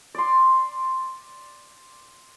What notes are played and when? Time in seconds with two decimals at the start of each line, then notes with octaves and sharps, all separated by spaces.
0.15 D5 C6